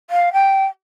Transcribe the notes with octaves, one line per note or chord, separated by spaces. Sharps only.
F5
G5